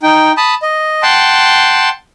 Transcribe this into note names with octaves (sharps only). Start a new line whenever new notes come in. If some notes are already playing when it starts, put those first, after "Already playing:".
D#4 G5
A5 B5 D#6
D#5
F#5 G5 A5 C6